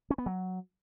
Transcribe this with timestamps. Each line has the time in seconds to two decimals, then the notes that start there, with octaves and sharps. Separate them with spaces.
0.10 C#4
0.18 B3
0.26 F#3